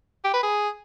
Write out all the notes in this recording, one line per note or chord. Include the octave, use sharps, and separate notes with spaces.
G4
B4
G#4